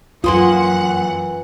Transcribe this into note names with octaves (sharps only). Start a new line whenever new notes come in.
F#2 E3 A#3 F4 F#5 C6 D#6